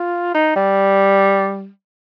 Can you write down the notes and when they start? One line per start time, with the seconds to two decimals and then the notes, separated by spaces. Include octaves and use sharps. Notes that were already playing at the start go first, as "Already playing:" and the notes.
Already playing: F4
0.34 D#4
0.56 G3